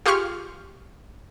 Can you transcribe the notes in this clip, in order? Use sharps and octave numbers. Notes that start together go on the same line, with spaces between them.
F4 G4 G#4 C6 C#6 F6